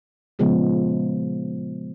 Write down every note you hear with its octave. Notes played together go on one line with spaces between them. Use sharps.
A#2 C#3 F3 G#3 B3